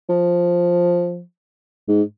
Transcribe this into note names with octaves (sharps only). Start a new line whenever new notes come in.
F3
G#2